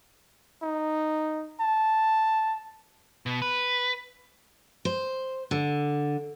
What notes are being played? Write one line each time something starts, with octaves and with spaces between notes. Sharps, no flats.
D#4
A5
B2
B4
C5
D3